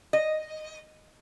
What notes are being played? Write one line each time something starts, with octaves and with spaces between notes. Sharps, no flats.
D#5